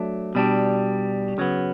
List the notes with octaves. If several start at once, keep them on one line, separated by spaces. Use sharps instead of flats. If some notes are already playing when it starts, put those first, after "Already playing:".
Already playing: F#3 A3 D4
B2 G3 D4
C#3 F#3 B3